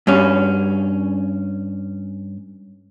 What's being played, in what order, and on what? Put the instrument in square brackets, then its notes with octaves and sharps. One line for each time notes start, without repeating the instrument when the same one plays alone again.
[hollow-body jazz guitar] G2 C#4